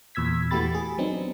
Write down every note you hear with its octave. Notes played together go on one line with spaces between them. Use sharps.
E2 A#2 E6 G#6 B6
E3 A3 F#4 G4 B5 A6
G#4
F#3 B3 C4 D4 D#4